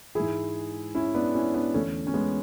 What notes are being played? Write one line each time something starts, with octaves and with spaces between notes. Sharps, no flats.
G#2 E3 E4 G#4
C#4 E4
B3 D4
C#4 E4
B3 D4
E2 D3 A3 C#4
C#4
G#3 B3